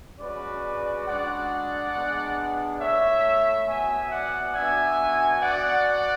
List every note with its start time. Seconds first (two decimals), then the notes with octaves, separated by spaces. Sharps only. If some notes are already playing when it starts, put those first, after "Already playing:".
0.19 G#3 C#4 F#4 B4 D5
1.06 G#3 D4 F#4 D5 F#5
1.94 G#3 B3 D4
2.80 A3 E4 C#5 E5
3.68 B3 F#4 E5 G#5
4.11 D5 F#5
4.55 B3 D4 F#4 E5 G#5
5.41 B3 F#4 D5 F#5